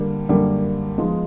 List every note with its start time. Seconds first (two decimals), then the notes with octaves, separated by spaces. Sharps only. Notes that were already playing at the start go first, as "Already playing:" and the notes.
Already playing: D3 G3 A#3
0.29 F#2 D3 G3 A#3
0.98 F3 G#3 B3 D#4